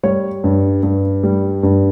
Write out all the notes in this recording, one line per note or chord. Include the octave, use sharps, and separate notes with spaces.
G3 C#5
G2
G2
G3
G2